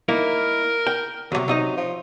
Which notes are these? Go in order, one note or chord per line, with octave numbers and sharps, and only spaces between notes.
A#3 D#4 E4 A#4
G5
D2 C3 F#3
C3 D#4 D#5
F3